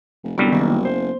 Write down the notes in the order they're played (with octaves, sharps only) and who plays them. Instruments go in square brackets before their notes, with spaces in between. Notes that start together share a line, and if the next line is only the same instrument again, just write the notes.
[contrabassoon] F1
[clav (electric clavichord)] C2 F#2 G3 [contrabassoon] D3 [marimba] B3
[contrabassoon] F#1 [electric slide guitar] D#3 A#3
[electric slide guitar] C5